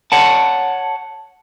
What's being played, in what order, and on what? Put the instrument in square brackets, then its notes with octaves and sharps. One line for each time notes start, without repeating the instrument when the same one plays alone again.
[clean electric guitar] C#5 F#5 A5